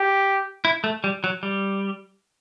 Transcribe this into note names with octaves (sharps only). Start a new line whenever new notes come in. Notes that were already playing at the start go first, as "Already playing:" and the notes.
Already playing: G4
E4
A3
G3
F#3
G3